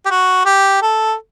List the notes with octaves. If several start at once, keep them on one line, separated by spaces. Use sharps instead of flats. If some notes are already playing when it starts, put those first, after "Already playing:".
G4
F#4
G4
A4